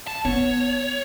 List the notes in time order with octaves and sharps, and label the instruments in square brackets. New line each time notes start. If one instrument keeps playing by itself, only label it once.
[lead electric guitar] A5
[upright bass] B3 [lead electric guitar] C#5